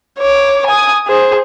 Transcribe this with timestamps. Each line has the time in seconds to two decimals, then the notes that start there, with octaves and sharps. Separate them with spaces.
0.19 C#5 D6
0.66 G#5 D#6
1.07 G#4 C5